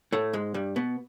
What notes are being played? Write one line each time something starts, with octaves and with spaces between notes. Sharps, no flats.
A2 A3
G#2 G#3
G2 G3
B2 B3